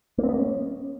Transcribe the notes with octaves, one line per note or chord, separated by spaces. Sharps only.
A#3
C4
B3
A#3
C#4